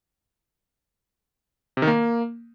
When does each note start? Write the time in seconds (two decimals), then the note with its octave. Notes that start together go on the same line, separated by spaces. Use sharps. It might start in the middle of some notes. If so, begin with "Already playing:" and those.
1.77 C3
1.82 D#3
1.87 A#3